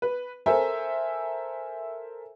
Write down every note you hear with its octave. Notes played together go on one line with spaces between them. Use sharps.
B4
A4 A#4 C5 E5 G#5